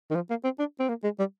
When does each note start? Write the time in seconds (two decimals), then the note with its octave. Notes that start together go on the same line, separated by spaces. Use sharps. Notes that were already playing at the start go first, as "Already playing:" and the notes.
0.11 D#3
0.15 F3
0.30 A#3
0.44 C4
0.59 D4
0.80 C4
0.89 A#3
1.04 G#3
1.19 G3